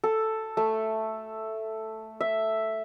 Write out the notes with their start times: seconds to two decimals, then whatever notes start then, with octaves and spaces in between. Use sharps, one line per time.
0.04 A4
0.57 A3
2.21 E5